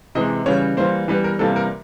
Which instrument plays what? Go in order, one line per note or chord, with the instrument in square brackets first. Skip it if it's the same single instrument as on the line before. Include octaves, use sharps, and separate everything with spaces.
[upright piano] C3 E3 G#3 D#5
C#3 E3 G3 C#5
E3 G3 A#3 C5
E3 G3 B3 B4
A#4
C3 E3 G3 A#3 A4
A#4